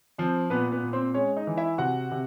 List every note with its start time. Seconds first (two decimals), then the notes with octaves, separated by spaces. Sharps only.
0.18 F3 C4 C5
0.50 A#2 B3 B4
0.72 B3 B4
0.83 A#2
0.93 C4 C5
1.14 G#3 C#4 C#5
1.36 D#4 D#5
1.47 E3
1.57 E4 E5
1.78 C3 F#4 F#5
2.11 C3